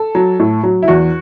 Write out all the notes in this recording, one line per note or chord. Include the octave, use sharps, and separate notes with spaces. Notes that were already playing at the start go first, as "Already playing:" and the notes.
Already playing: A4
F#3
A2
F#3
E4
E2 F#4